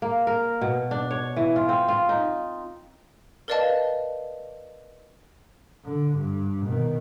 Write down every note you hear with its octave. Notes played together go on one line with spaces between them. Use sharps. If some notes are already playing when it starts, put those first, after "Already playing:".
A#3
A#4
B2
D4
C#5
E3
F4
C4
F4
D#4
A#4 B4 D5 D#5 F5 A5
D3
G2
B2 D#3